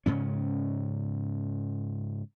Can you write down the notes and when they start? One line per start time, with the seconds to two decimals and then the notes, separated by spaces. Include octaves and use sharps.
0.06 G#2 C#3 C#4